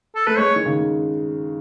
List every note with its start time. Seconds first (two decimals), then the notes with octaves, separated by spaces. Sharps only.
0.15 A4
0.27 A3 B4
0.38 G#3 C#5
0.56 D#3
0.66 C#3